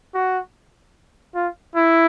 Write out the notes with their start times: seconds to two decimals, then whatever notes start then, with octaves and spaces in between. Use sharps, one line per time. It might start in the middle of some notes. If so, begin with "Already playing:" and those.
0.14 F#4
1.35 F4
1.75 E4